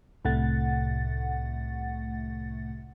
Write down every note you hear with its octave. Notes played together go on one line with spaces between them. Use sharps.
C2 A2 C3 A3 F#5 A6